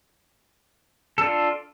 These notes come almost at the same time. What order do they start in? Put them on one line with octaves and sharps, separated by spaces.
A4 D4 F4